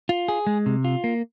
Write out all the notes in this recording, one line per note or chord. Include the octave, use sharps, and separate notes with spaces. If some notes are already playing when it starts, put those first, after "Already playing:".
F4
G#4
G#3
C3
F4
A#3